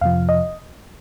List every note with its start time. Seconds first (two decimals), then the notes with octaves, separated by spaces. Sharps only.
0.01 F2 C3 F3 F5
0.29 D#5